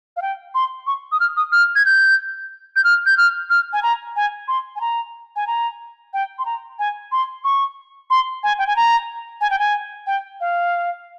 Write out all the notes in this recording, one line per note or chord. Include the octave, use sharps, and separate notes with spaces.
F5
G5
C6
C#6
D#6
F6
D#6
F6
G#6
G6
G6
F6
G6
F6
F6
G#5
A#5
G#5
C6
G#5
A#5
G#5
A#5
G5
C6
A#5
G#5
C6
C#6
C6
G#5
G5
G#5
A#5
G#5
G5
G#5
G5
F5